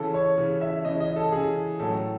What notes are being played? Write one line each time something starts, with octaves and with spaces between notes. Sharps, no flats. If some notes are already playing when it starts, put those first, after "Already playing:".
Already playing: C#3 E3 A4
C#5
C#3 E3
E5
C#3 E3 D#5
D#5
A4
C#3 E3 G#4
A2 F#3 A4